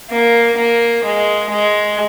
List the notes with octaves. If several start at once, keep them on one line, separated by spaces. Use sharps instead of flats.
A#3
A#3
G#3
G#3